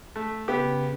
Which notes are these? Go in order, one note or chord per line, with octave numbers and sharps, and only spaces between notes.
A3
C#3 B3 G4